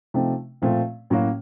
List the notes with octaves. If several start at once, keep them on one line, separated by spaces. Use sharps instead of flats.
C3 F3 A3 C4 D#4
A#2 F3 A3 C4
A2 F#3 A#3 C#4 F#4